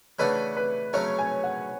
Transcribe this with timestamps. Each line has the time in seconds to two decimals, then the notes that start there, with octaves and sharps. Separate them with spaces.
0.19 C#3 E3 A3 D4 F#4 B4
0.57 B4
0.93 C#3 F#3 A3 C#4 C#5
1.18 G#5
1.44 F#5